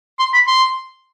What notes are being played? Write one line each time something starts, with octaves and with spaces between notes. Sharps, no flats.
C6
B5
C6